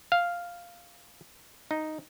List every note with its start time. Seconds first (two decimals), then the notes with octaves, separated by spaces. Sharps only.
0.12 F5
1.71 D#4